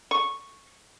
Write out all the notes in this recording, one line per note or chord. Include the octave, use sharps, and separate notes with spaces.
C#6